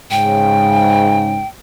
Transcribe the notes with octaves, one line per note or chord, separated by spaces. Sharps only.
G#2 C#3 G5